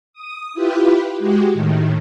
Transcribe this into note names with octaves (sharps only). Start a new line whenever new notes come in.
D#6
E4 F4 G4 B4
G#3 F#4 G4
A2 D#3